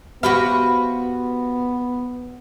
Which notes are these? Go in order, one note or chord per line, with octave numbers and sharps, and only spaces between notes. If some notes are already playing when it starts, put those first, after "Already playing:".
B3 F#4 G4 C5 F5 G#5 B5